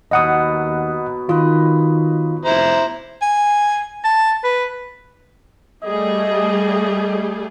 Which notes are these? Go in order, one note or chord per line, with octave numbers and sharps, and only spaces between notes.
D#2 B2 F#3 B3 D#5 F#5 D#6
D#3 F4 B4 D#5
F1 E4 C5 A#5
G#5
A5
B4
G3 A3 G#4 D#5